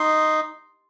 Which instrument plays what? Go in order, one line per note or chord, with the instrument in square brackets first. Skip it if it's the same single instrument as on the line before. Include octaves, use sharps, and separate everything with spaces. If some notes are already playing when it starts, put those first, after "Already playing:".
Already playing: [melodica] D#4 [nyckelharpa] C6